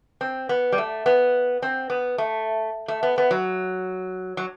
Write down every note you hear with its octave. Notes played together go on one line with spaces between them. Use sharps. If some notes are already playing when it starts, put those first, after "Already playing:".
C4
B3
G3
A3
B3
C4
B3
A3
A3
B3
B3
F#3
F#3